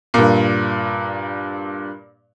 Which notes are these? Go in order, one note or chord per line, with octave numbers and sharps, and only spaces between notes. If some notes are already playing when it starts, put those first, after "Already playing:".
G2 A#2